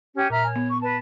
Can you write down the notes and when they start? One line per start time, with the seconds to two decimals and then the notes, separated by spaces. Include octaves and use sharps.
0.14 C#4 G4
0.30 A#2 E5 A#5 F6
0.44 C#5 G#5
0.56 B3
0.69 C#6
0.81 B4 A5